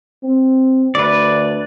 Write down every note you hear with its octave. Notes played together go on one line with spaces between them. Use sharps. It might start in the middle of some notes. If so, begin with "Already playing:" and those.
C4
D2 B4 D5